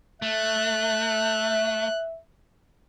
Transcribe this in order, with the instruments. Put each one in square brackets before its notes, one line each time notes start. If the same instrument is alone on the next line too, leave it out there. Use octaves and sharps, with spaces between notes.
[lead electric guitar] A3 [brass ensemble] E5 [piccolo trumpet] F#6